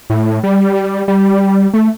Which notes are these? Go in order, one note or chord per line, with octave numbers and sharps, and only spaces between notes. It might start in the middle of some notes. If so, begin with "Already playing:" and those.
A2
G3
G3
A3